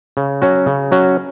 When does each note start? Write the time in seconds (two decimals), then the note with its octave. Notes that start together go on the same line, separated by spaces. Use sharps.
0.17 C#3
0.42 F#3 C#4 F#4
0.66 C#3
0.92 F#3 C#4 F#4